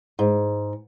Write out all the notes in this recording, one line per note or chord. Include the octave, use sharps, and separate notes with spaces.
G#2